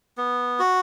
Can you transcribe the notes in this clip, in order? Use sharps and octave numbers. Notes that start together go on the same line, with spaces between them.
B3
F#4